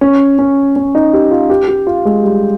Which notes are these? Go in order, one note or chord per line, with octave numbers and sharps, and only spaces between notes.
C#4
C#4
C#4
D#4
G4
F4
G4
G4
F4
G#3
G3